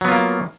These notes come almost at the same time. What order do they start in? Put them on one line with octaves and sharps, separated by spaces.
F#3 B3 F4 A#3